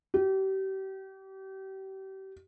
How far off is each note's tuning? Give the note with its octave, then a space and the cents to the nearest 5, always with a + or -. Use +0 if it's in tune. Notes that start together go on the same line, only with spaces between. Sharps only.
G4 -35